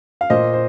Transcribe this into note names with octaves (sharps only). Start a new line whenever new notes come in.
F5
A#2 C5 D#5
C5